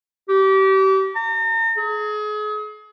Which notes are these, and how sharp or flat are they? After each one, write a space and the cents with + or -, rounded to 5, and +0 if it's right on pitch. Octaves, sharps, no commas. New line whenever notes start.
G4 -30
A#5 -40
G#4 +35